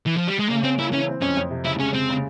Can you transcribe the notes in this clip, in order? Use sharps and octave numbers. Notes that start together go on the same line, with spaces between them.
E3
F3
G3
G#3
C#3 A#3
C4 C#4
A#3 E4
E3 C#4
C4
F2 C#4
F2
C3
C#3 E4
G#3 C#4
C#3 C4
C#3